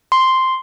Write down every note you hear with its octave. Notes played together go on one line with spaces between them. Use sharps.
C6